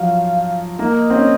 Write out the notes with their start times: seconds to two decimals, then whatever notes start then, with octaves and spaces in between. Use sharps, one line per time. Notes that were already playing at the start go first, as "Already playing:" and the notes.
Already playing: F3 F#3 F5
0.79 A#3 D#5
1.10 C4
1.15 C#4